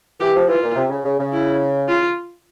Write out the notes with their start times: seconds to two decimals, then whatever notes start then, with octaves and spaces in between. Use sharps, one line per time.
0.20 E3 G4
0.34 F3
0.47 E3 F4
0.63 A#2
0.76 C3
0.90 C#3
1.05 C#3
1.19 C#3
1.33 E4
1.89 F4